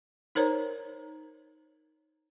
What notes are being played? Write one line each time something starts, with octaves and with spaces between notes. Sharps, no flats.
D#4 A#4 C5 C#5 A#5